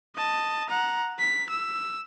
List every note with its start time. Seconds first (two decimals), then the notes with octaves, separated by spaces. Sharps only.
0.15 D#5 A5
0.69 F#5 A#5
1.19 B6
1.50 E6